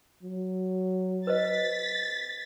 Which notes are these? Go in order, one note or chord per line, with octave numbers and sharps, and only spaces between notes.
F#3
B4 C5 D#5 A6 B6